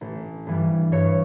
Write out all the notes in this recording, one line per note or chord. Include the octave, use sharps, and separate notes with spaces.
A1
G2 E3 G3
G2 C#5